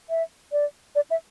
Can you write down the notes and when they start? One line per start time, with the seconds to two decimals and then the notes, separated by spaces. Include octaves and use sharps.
0.10 E5
0.52 D5
0.95 D5
1.11 E5